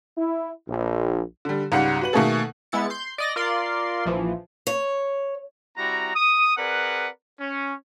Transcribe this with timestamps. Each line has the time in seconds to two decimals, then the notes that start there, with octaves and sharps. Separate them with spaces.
0.17 E4
0.68 A#1
1.45 D3 G3
1.72 C#2 G#2 G3 F#5 C#7
2.01 F#4 B4 F#7
2.13 B2 D#3 A3 A#3 G#4 A4
2.72 G#3 B3 E4 A6 C#7
2.90 C6 G6
3.18 D5 D#5 A#6
3.36 F4 A#4 D5 C6
4.05 A#1 E3 F3
4.67 C#5
5.78 G3 C4 E4 F#4 A#5
6.14 D#6
6.57 C4 G#4 A#4 B4 D5 F#5
7.39 C#4